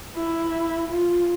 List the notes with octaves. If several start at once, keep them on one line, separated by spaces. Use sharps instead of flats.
E4
F4